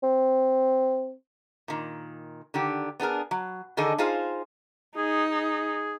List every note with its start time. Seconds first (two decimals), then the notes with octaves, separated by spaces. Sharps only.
0.03 C4
1.68 A#2 D#3
2.54 D3 D#3 G4
3.00 B3 D4 G#4 A#4
3.31 F#3
3.77 D3 D#3 G#4 A4 D#5
3.98 D#4 F4 G#4 C5 F5
4.97 D#4 G#4
5.32 G#4